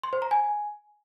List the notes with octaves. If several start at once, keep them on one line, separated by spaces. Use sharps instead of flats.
C6
C5
A#5
G#5